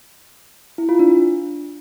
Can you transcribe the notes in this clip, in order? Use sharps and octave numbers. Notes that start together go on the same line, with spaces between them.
E4
F4
D4